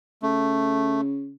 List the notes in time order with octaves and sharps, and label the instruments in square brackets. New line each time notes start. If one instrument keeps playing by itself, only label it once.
[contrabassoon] C#3 [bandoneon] A3